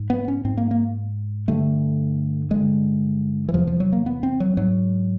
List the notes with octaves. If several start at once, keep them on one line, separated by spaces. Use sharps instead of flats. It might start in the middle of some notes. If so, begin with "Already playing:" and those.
Already playing: G#2
B3
C#4
G#2 C4
A#3
A#3
G2 D3 A3
G2 D3 G#3
E3
E2 C3 F3
F3
F#3
A#3
B3
C4
F#3
G#2 F#3